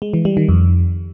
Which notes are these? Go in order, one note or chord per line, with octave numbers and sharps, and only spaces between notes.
G#3
E3
G3
D#3
F2